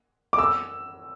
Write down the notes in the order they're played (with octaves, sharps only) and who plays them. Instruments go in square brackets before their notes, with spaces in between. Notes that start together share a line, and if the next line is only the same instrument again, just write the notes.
[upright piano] D6
E6